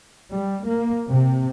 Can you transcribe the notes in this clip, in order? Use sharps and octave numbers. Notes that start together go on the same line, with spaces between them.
G3
A#3
C3